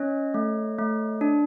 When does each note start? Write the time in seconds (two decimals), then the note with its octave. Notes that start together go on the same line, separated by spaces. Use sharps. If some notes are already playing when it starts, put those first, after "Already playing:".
Already playing: C#4 C#5 D#5
0.34 A3
0.79 A3
1.21 D4